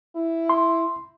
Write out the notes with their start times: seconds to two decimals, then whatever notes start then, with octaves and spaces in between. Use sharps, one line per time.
0.16 E4
0.49 C6